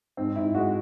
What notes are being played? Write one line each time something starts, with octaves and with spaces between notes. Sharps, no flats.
G#2 C4
G#2 E4
G#3 F#4